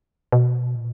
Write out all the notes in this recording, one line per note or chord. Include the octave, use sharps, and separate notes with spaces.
B2
A#2